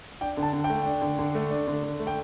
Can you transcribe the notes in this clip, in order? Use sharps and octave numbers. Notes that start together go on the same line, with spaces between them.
D4 G5
D3
A5
D3
G5
A3
D4
D3
D3
A3
D4
D3
D3
A3
G5